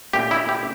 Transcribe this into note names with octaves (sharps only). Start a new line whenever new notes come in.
A#2 A3 C#4 E4 G4
E4
G4